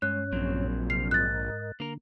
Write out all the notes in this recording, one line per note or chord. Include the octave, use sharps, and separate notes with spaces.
G2 G#3 C#4 C#5 F#6
A#1 A#2 F#3 C4
C3 F6 C7
G#2 A#4 D#5 F#6 A6
D3 A#3 A#4